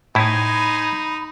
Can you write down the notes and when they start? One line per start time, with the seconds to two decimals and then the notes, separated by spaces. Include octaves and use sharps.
0.15 A2 D#4 E4 C5 D#5 G#5 B5